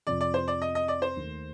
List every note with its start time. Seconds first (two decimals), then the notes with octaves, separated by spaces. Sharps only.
0.07 F2 C3 F3 C4 D5
0.21 D5
0.34 C5
0.48 D5
0.62 D#5
0.75 D#5
0.88 D5
1.02 C5
1.16 D#2 D#3 A3